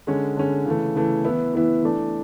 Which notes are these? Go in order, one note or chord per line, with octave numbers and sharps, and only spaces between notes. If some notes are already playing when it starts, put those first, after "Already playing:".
D3 G#3 C#4
D3 G#3 C#4
C#3 E3 A3
C#3 E3 A3
E3 B3 E4
E3 B3 E4
E3 A3 D4